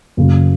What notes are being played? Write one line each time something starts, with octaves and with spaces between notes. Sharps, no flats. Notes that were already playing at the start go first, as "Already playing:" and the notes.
F#1 F#2 C#3